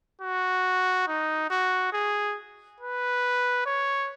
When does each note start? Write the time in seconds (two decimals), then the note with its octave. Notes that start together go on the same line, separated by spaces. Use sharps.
0.21 F#4
1.08 D#4
1.50 F#4
1.93 G#4
2.80 B4
3.66 C#5